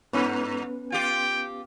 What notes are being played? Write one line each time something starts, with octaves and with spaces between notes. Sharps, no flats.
G2 B3 C#4 B4
F4 G4 G5